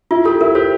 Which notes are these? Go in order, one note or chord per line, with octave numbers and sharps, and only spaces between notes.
E4 F4
G4 A4
E4 A#4
G4 C5